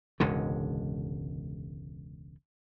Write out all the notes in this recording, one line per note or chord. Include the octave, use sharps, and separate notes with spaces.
E1 C#2 G#2 D3